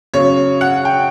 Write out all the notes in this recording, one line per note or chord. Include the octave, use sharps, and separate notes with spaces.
C#3 F#3 C#5
F#5
G5